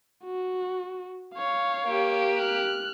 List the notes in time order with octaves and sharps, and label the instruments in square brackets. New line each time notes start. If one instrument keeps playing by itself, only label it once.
[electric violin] F#4
C#5 F5
[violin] A#3 G4
[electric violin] F6 F#6